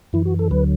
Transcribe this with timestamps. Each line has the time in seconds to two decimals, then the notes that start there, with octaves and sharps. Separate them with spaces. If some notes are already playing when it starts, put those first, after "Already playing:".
0.13 F#2 E3 E4
0.26 F#4
0.39 A4
0.51 D2 D3 F#3 B4